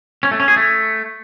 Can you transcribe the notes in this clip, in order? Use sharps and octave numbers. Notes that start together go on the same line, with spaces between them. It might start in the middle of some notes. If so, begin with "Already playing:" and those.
C#4
A3
C#4
G#4
A3